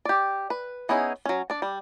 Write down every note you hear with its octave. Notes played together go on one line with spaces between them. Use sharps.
G4 D5
B4
B3 C#4 D#4 E4 G#4
F#3 C#4
D4 D5
G3